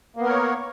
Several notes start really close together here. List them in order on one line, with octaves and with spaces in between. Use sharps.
A#3 B3 A#4 C#5